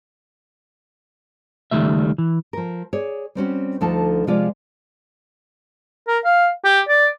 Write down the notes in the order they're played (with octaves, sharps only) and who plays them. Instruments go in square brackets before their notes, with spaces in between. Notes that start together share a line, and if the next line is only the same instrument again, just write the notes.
[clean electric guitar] C#2 D#3 G3 A3 E5
E3
[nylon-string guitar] F3 A#4
G#4 C#5 D5
G3 C4 C#4 F#4
D2 D3 F3 D#4 A4 A5
C3 F3 G#3 F4 D5 F5
[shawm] A#4
F5
G4
D5